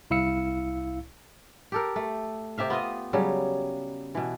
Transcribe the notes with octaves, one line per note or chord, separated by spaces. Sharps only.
C2 E4 F5 E6 C#7
G4 A4 A#4
A3
C3 G4 E5 F5
B3 F4 D#5
C#3 F#3 G3
B2 E3